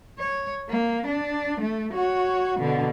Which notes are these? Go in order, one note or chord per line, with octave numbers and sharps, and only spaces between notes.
C#5
A#3
D4
A3
F#4 C#5
B2 D3